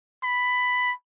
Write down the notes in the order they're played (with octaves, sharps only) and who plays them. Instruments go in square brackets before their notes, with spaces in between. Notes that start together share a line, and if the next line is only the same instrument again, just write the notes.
[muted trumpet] B5